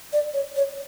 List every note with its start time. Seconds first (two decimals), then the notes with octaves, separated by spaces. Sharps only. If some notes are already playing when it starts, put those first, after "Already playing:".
0.13 D5
0.34 C#5
0.56 C#5